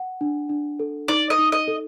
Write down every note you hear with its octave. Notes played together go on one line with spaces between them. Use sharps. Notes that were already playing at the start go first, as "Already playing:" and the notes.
Already playing: F#5
D4
D4
A4
D#4 D5
D#5
D#4
D#5
A4